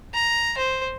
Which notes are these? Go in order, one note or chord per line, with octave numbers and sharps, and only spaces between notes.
A#5
C5